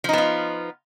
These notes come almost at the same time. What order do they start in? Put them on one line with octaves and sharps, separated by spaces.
F3 D#4 B3 F4